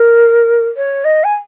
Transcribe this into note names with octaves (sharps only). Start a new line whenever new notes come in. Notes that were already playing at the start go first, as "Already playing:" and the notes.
Already playing: A#4
C#5
D#5
G#5